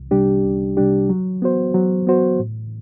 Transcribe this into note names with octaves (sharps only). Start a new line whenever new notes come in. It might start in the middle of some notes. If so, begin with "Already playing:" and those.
Already playing: C2
C3 G3 D4 G4
C2
C3 G3 D4 G4
F#3
B3 F#4 C5
F#3
B3 F#4 C5
A2